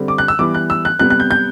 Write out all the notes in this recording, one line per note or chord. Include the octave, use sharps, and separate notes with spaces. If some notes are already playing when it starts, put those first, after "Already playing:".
Already playing: D3 G3 C4
D6
F#6
E6
E3 G3 B3 D6
F#6
E6
F#6
C3 G3 B3 F#6
F#6
G6
G6